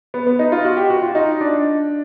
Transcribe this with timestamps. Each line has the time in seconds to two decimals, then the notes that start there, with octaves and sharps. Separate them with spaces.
0.14 B3
0.27 B3
0.39 D#4
0.52 F4
0.65 F#4
0.77 G4
0.90 F#4
1.02 F4
1.15 D#4
1.41 D4